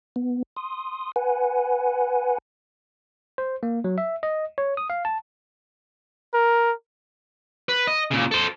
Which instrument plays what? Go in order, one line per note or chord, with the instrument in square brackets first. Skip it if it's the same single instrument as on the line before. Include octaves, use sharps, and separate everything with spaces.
[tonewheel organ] B3
C6 D#6
B4 F#5 G#5
[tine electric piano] C5
A#3
F#3
E5
D#5
C#5
D#6
F5
A5
[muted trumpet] A#4
[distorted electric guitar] B4
D#5
A#2 C#3
A4 C5